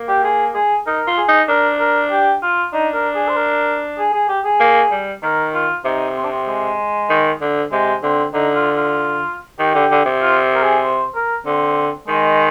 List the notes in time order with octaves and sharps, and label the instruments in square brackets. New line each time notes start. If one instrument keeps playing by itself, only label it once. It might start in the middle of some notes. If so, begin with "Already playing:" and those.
Already playing: [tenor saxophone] A#3
[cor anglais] G4
G#4
G#4
[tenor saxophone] D#4 [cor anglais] A#4
[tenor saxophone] F4
[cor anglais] G#4
[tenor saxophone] D#4
[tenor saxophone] D4 [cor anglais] A#4
[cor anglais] A#4
G4
F4
[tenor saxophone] D4 [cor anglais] D#4
[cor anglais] A#4
G#4
C5
A#4
G#4
G#4
G4
G#4
[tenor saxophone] A#3
G3
[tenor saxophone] D#3 [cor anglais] A#4
[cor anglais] F4
[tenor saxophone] C3 [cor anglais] D#4
[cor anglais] C4
D4
C4
G#3
[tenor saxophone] D#3
D3
[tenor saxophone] C3 [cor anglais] G#3
[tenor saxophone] D3 [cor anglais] C4
[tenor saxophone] D3 [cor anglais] D#4
[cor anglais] F4
F4
[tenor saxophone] D#3 [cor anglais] G4
[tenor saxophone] D3
D3
C3
[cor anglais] F4
A#4
G#4
C5
A#4
[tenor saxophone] D3 [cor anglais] C4
[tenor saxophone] D#3 [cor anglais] G#3